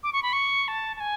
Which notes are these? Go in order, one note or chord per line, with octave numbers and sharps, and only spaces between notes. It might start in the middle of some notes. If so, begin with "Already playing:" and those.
D6
C#6
B5
C#6
A5
A5
G#5